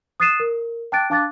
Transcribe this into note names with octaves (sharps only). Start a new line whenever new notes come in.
D#6 F#6 A6 C7 D#7 E7
A#4
G5 A5 D6 F#6 A6 D7
D4 F5 A5 D6 F#6 A6